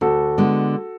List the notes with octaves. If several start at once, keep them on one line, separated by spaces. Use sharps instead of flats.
D2 F#4 A4
D3 G#3 B3